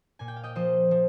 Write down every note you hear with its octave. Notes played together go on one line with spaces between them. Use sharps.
A#2 G#5
G5
F5
D#5 G5
F3 C5 D#5
F3